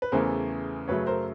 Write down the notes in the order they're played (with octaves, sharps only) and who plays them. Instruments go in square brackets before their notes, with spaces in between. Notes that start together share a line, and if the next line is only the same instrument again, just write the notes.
[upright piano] B4
E2 C#3 E3 A3 A#4 C5
F#2 C#3 F#3 A3 B4 C#5
A#4 C5